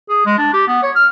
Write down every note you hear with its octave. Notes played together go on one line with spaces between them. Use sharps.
G#4
G#3
D4
G4
B3
C#5
F6